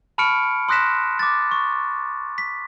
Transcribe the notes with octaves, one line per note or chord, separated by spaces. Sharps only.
A5 B5 C#6 F6 C#7 D7
C6 D#6 F#6 A#6 B6 E7
D6 A6
C#6
B6